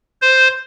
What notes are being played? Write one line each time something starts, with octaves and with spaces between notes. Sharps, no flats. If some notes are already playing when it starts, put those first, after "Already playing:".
C5